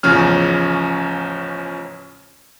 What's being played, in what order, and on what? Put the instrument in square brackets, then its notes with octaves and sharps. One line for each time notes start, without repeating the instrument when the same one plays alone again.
[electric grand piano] A1 E2 C#3 F3 C#4 F6